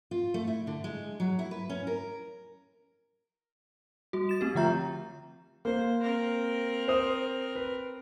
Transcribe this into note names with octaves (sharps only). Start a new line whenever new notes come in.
F4
A3
E4
D3
G#3
F#3
E4
B4
C#4
A#4
G3 F#4
A6 E7
A3 C4 G4
D3 F3 F4 E5 A#5 G6
A#3 C5
C4 A#4
C5 D#6
B4